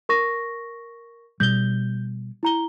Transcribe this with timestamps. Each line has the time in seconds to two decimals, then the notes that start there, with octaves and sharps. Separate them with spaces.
0.09 A#4 C#6 A#6
1.40 B2 G3 G6 G7
2.43 E4 A#5 G7